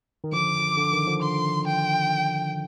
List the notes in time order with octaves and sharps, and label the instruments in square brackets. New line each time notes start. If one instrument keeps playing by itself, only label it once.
[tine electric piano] D#3
[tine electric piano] D3 F3 [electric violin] D6
[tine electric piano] D3
D#3
D3 F3
[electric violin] C6
G5